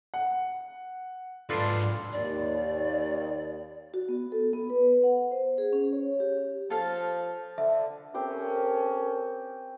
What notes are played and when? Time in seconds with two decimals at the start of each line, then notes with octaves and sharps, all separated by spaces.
0.14 F#5
1.50 G#2 D4 F4 A4 B4 C6
2.12 D#2 D5
3.94 F#4
4.09 B3
4.32 A4
4.53 B3
4.70 B4
5.03 F#5
5.31 C5
5.58 G#4
5.73 C#4
5.93 C#5
6.20 G4
6.70 F3 A4 F5 A5
7.58 D3 E5
8.14 C4 C#4 G4 A4 A#4 C5